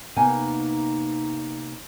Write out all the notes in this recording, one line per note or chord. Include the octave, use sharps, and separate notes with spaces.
C3 A#3 B3 D#4 G#5